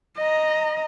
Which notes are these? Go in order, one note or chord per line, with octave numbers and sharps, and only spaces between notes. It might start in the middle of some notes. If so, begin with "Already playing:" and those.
D#5 A#5